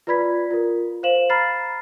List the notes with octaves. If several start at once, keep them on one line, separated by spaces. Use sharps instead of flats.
F4 B4 D5 B5 G#6 B6
F4 A#4
C5 F5 E7 F#7
A#5 B5 F6 A6 C7